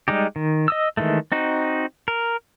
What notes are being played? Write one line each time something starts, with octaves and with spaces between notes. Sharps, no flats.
G3 G#3 D#4 G4
D#3
D#5 D#6 E6
D#3 E3 G#3 A3
C4 D#4 F#4
A#4